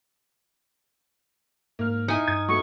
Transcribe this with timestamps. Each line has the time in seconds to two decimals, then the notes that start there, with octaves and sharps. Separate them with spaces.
1.79 G#2 A#3 F6
2.08 D#4 E4 G#5 C#7
2.28 G2 D#6 G#6
2.48 F#3 A3 B3 C#6